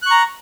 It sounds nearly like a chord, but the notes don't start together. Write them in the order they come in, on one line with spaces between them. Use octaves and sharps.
F#6 C#6 A#5